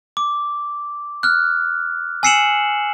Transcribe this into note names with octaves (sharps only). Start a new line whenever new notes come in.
D6
F6 F#6
G#5 E6 C7 C#7 E7 F#7